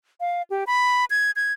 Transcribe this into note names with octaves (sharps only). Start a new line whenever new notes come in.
F5
G4
B5
G#6
G#6